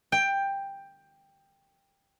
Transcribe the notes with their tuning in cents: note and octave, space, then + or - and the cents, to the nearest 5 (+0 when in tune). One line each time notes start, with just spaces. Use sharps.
G5 +10